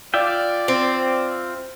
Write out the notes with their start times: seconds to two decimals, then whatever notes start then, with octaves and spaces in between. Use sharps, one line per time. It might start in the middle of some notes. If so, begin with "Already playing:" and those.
0.14 F4 D5 E5 G5
0.68 C4